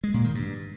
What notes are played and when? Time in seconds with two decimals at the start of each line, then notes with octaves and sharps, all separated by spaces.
0.04 G#3
0.14 A#2
0.24 D#3
0.35 G2